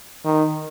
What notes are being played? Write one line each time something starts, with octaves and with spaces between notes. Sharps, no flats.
D#3